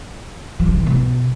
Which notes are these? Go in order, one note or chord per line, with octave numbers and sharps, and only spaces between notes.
F3
D3
E3
B2